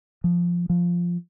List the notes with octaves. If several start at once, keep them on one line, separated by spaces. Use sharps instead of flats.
F3
F3